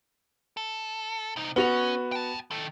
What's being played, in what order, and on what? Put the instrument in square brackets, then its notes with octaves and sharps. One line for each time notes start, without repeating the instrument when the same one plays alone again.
[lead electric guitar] A4
C3 D#4
[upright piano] B3 F#4 F7 [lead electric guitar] C#4
[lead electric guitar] G5 A5
D#3 A4